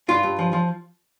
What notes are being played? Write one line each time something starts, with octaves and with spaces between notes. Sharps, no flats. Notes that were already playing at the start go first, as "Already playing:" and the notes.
G2 F4
G2
F3
F3